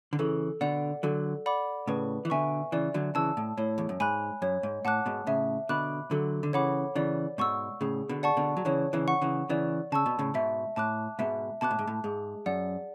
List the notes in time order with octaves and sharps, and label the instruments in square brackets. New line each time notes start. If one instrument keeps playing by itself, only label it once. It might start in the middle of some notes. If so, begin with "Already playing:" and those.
[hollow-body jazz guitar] D3
[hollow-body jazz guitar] C#3 E3 [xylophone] A4
[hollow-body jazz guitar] B2 D3 [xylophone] D5 F#5
[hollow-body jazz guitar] D3 F#3 [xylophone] A4
[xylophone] D5 F#5 B5 D6
[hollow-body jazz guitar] A2 C#3 [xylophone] B4
[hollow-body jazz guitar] E3
[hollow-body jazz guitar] B2 D3 [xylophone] E5 G#5 C#6
[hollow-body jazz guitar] C#3 E3 [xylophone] D5
[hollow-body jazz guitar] D3 F#3
[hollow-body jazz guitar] C#3 E3 [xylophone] A5 E6
[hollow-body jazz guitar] A2
[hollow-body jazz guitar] A2 [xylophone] C#5
[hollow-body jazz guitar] E2
F#2
[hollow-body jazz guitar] G#2 [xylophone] G#5 B5 F#6
[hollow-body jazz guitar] F#2 [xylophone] C#5
[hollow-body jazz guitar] G#2
[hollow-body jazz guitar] A2 [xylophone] F#5 A5 D6 F#6
[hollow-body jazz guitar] G#2 B2
[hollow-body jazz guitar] A2 C#3 [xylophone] E5
[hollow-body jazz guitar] B2 D3 [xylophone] B5 D6 F#6
[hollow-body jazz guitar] D3 F#3 [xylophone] A4
[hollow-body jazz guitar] D3
[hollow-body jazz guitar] C#3 E3 [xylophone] C#5 F#5 B5 D6
[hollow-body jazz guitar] C#3 E3 [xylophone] D5
[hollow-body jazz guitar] G#2 B2 [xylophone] F#5 C#6 E6
[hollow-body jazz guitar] A2 C#3 [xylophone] G#4
[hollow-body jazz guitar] B2 D3
[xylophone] D5 F#5 A5 C#6
[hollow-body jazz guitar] B2 D3
F#3
[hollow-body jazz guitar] C#3 E3 [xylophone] C#5
[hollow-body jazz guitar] C#3 E3
[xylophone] F#5 C#6
[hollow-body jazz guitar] C#3 E3
[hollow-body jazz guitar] C#3 E3 [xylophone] D5
[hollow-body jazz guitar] C#3 [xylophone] A5 C#6 E6
[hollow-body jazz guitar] B2
A2 C#3
[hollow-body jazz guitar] G#2 B2 [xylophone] E5
[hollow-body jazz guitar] A2 [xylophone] A5 D6 F#6
[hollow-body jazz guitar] G#2 B2 [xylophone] E5
[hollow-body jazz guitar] B2 [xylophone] A5 D6 F#6
[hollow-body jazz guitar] A2
G#2
A2
[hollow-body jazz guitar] G#2 [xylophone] G#4
[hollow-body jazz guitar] F#2 [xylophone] D5 F#5